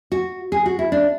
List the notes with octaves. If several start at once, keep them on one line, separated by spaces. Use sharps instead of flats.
F#4
G#4
F#4
E4
D4